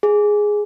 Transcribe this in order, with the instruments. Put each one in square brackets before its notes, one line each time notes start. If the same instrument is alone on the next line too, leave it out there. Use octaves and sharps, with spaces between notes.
[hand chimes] G#4